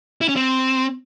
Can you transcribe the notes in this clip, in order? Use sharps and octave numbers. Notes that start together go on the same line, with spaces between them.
E4
C#4
C4